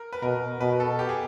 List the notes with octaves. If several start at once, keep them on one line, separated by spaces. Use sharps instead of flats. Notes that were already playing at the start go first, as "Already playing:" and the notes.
Already playing: A#4
B4
B2 A#4
B2 B4
A4
G4
G#4